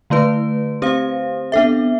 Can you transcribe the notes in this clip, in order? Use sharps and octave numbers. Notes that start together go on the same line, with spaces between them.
D3 A3 E4 B4
C4 G4 C5 F5
B3 D4 A4 E5